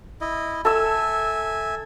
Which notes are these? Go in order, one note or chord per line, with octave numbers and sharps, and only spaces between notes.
E4 D#5
A4 E5 G#5 E6